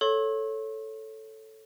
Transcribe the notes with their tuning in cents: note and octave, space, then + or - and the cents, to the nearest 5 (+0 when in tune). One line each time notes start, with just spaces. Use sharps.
A4 +0 C#5 +0 C#6 -45